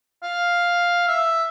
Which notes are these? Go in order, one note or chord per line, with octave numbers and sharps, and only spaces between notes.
F5
E5